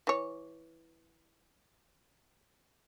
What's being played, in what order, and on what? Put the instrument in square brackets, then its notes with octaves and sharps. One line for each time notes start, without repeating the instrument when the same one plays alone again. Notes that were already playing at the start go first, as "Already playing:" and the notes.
[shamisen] E3 C#5